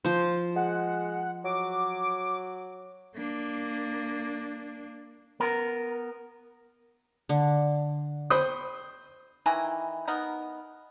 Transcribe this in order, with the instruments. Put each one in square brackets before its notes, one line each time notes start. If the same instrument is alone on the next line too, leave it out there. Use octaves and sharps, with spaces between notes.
[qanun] F3 C5
[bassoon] G#3 [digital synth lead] F#5
[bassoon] F#3 [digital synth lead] D6
[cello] A#3 D4
[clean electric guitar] B3 A#4
[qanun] D3
[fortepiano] C5 B5 D#6 [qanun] G5 C#6
[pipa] D#3 E3 G#5 A#5
B3 D#4 A#4